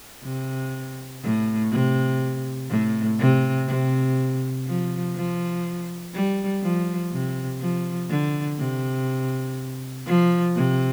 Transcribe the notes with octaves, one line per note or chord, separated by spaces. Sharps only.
C3
A2
C3
A2
C3
C3
F3
F3
G3
F3
C3
F3
D3
C3
F3
C3